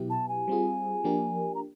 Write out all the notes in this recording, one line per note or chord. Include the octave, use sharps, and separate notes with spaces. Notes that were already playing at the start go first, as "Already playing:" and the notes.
Already playing: B2 F#3 B3 E4 G4
A5
G#5
G3 C4 F4 G#4
F3 A#3 D4 G4 A#4
A#5